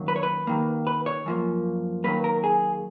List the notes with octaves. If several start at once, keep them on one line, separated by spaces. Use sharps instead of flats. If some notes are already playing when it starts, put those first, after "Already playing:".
Already playing: F#2 D#3 F#3 A#3
B4
C#5
B4
D#2 D#3 A#3
B4
C#5
F#2 F3 A#3
D#2 D#3 F#3 A#3 B4
A#4
G#4